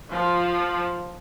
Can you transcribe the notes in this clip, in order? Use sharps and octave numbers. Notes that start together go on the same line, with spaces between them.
F3